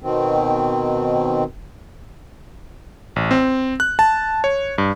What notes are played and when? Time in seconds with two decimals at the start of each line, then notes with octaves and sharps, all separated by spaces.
0.03 B2 D#3 C4
3.16 A1
3.31 C4
3.80 F#6
3.99 A5
4.44 C#5
4.78 G2